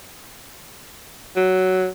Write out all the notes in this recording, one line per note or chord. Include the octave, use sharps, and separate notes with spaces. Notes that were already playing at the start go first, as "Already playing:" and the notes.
F#3